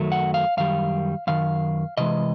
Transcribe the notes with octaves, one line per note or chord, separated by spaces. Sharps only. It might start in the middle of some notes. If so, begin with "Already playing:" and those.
Already playing: F#2 D#3 F#3 A3
F#5
F5
F#2 D#3 G3 F5
F#2 D#3 F5
C3 E3 G#3 D#5